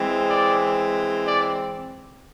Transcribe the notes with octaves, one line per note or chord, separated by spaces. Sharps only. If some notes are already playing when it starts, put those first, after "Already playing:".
Already playing: E3 G#3 C4
D5
D5